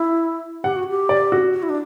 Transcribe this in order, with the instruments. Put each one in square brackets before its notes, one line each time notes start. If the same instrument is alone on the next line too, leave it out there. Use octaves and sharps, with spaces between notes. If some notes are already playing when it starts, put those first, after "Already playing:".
Already playing: [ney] E4
[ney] G4 [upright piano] F#5
[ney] F#4
G4
[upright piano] D5
F#4
[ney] F#4
E4
D4